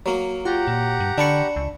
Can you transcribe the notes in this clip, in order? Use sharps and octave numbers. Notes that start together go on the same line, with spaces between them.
F#3 A#3
F4 G4 F#5 A#5
A#2
G2
D3 D4 B5 C#6
C#2